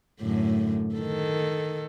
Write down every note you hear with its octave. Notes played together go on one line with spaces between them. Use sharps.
F#2 A2 D3
D#3 A4